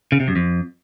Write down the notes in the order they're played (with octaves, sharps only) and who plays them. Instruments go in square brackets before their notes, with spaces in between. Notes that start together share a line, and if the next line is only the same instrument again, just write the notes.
[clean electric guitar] C#3
C3
F#2
F2